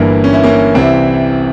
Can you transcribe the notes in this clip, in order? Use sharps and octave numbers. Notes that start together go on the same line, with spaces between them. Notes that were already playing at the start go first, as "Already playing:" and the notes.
Already playing: G1 G2 E3 A#3
C#4
E4
A#3 C#4
C2 C3 E3 C4 E4